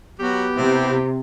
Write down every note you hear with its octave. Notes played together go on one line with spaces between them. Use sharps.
F#3 B3 F#4 G4
C3 C4 E4